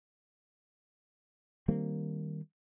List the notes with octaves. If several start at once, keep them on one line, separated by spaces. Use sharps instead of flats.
D#3 G3 A#3 C4